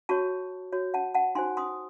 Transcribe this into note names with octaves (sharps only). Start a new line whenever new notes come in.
F#4 C#5 A5 C#6
F#4 C#5
F#5 A5
F#5 A5
D#4 F#4 C5 G#5 C6
C6 D#6